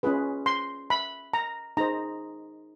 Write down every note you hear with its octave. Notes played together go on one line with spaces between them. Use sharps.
C#4 F4 G#4 B4
C6
B5
A#5
D#4 G#4 C5 A#5